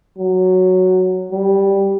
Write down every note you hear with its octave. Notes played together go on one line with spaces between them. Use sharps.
F#3
G3